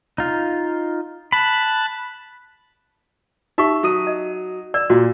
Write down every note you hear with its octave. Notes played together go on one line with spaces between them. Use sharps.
D#4 F4
A5 B5 F#6
D#4 G4 E5 C#6
F#3 D#6 D#7
D#5
D5 E6
A#2 F4 F#4